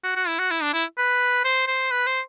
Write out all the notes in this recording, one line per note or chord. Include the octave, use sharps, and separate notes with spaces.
F#4
F#4
E4
F#4
E4
D4
E4
B4
C5
C5
B4
C5